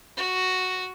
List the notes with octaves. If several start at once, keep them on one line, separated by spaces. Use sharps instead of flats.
F#4